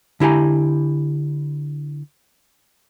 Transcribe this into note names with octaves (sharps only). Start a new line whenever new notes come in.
D3 E4 G4 G#5 A#5